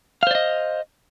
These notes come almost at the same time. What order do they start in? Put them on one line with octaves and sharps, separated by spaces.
F5 C5 D5 D#5